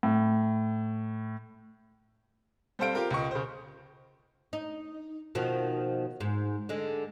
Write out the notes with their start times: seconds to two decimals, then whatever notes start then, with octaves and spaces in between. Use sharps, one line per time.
0.03 A2
2.79 G3 C4 A4 C5 F5 D7
2.95 F4 G4 A#4
3.11 C#2 D#5 C#6
3.31 C#3 C5
4.53 D#4
5.35 B2 D#3 F3
6.20 G#2
6.69 D3 G#3